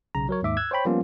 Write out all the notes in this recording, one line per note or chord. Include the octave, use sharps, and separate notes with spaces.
B1 C#3 A#5
F#3 A#4 C#5
D#2 G#2 E5 D6
E6 F#6 G#6
C5 C#5 G5 B5
F3 G3 A#3 B3 C#4 F4